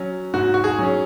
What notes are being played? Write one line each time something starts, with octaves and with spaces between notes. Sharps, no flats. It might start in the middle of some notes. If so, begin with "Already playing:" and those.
Already playing: F#3 C#4
G#2 F#4
F#4
G#4
F#3 C#4